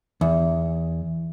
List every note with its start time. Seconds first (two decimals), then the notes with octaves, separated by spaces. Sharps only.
0.21 E2